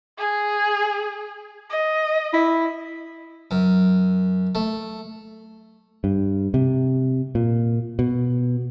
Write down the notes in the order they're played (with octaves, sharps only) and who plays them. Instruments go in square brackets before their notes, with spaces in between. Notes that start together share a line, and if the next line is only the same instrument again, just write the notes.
[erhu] G#4
D#5
[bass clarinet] E4
[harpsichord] F#2
A3
[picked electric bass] G2
C3
A#2
B2